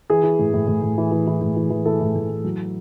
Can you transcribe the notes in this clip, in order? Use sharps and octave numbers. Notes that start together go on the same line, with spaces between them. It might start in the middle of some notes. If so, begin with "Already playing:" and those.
E3 G#4
E3
A2
A2
A2
A2
E3
E3
E3
A2
E3
E3
E3 A4
A2
A2
E3
F#3